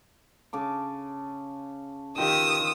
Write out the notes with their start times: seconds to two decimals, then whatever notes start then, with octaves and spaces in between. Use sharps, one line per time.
0.53 C#3 A5 D6
2.18 D#3 F4 G4 D#5 G5 D#6 E6